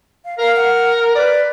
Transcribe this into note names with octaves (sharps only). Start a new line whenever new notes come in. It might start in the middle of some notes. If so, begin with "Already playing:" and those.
F5
A#4 F5
F#5
B4 D5